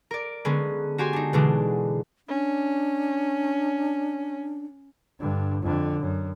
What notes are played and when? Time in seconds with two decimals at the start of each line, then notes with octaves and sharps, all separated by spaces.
0.11 A#4 D5
0.45 D3 G#3 B3 C#4
0.98 F#4 G4 G#5 C6
1.13 D4 D#4
1.33 B2 D3 E3 G#3 D4
2.28 C#4 D4
5.19 G2 D3
5.63 F2 D3
6.00 F#2